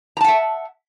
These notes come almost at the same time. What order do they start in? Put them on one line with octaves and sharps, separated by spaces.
A#5 A5 F#5 E5